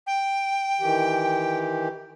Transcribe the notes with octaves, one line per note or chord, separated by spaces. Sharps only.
G5
D#3 E3 G4